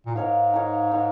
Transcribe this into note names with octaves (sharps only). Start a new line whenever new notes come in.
A#2
G#2 D#4 A#4 C#5 F5
D#4 A#4 C#5 F5
D#4 A#4 C#5 F5